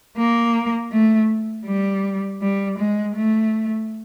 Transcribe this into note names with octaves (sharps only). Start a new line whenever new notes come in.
A#3
A3
G3
G3
G#3
A3